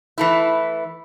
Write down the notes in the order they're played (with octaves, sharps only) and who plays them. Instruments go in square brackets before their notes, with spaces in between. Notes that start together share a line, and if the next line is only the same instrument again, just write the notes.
[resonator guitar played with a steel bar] E3 A3 E4